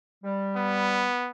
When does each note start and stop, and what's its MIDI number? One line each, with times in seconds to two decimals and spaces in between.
0.23 1.08 55
0.56 1.31 59